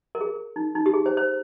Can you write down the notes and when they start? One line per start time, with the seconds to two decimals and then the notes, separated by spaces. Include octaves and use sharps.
0.15 A#4
0.21 G#4
0.56 D#4
0.75 D#4
0.86 G4
0.94 G#4
1.06 C5
1.17 C5